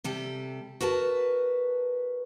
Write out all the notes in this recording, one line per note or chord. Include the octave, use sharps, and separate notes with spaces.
C3 G3 A4
F#4 A#4 B4 A5